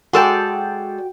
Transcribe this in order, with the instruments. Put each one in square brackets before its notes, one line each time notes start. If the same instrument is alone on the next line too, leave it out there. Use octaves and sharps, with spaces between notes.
[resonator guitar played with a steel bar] G#3 A4 D5 [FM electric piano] F#4 G5